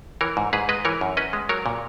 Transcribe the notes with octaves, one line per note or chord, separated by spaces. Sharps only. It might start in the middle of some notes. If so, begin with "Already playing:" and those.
E3 A#4 C#5
G#2
G#2 G#4 B4
G#3 B4 D#5
E3 A#4 C#5
F#2
C#4 B4 D#5
G#3
F#3 A#4 C#5
A#2